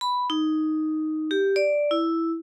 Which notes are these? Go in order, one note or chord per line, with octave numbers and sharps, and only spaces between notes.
B5
D#4
G4
D5
E4